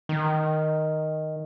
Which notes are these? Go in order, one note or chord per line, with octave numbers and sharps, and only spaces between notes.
D#3